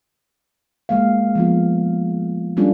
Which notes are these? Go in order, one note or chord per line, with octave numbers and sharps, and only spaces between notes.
G#3 A#3 F5
F3 B3 F4
G3 A3 C#4 D4 F4